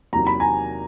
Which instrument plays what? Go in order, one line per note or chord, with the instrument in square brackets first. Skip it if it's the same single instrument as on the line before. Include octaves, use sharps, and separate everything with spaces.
[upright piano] E2 C3 D#3 F#3 A#3 [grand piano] A#5
[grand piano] B5
G#5 A#5